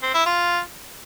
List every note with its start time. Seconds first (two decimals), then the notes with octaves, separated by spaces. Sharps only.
0.03 C4
0.14 E4
0.26 F4